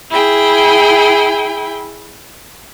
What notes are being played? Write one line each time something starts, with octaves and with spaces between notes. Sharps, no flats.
E4 G#4 G5